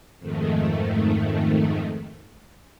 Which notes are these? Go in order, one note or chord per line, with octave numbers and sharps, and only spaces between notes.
F2 G#2 D#3 A3